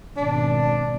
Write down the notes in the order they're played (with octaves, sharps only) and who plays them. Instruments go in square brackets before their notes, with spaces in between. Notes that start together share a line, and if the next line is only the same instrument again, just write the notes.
[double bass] G#1 B2 [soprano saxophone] D4